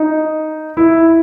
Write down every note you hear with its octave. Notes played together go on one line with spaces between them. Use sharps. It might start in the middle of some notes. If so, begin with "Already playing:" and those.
Already playing: D#4
E4